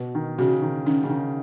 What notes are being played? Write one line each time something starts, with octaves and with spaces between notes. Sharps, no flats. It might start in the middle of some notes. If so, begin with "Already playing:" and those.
Already playing: B2 B4
D#3
C#3 F#4
D#3
D#3 C#4
C#3
D#3